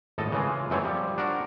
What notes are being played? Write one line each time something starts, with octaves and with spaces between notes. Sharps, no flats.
G#1 A2 A4 D#5 A5
C#3 E3 G#3 F4
F#2 E3 A3 C4 C#5
F3 G3
D4 F#4 A#4